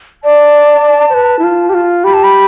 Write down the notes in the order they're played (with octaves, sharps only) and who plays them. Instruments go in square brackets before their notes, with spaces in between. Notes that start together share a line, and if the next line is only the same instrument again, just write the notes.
[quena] D5 [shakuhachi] A5
[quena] C5
B4
E4
F4
G4
F4
[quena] G4 [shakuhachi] B5
[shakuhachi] A5
B5